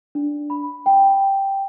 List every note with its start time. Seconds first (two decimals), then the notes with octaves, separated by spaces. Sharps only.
0.15 D4
0.50 B5
0.86 G5